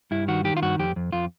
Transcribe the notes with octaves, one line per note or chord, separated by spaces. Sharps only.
G2 E4
D#3 F#4
D#3 G4
F4
G2 F#4
F2 G4
F2
F2 F4